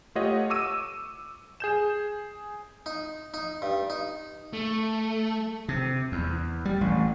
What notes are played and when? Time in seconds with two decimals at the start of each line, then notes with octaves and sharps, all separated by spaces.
0.15 A3 F4 G4 C#5 D#5 F#5
0.50 C#6 D6 E6 D#7
1.60 G#4 G6 E7
2.86 D#4
3.34 D#4
3.62 G2
3.90 D#4
4.53 A3
5.68 C3
6.12 E2
6.65 G3
6.81 A1